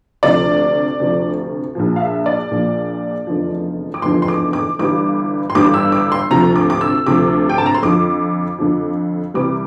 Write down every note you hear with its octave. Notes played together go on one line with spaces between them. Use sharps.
D2 C3 F3 D5
D2 C3 F3
A#1 A#2 F3
F5
E5
D5
A#1 A#2 F3
F1 E2 D3 F3
D6
F1 E2 D3 F3 C6
C6
D6
D6
G1 G2 E3 G3 D6
C6
G1 G2 E3 G3 D6
E6
D6
C6
D2 C3 F3 A#5
D6
D6
E6
D2 C3 F3 D6
G5
A5
A#5
C6
F2 D3 F3 D6
F2 D3 F3
C2 C3 E3 G3 D6